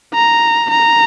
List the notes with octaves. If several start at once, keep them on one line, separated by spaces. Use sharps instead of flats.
A#5
A#5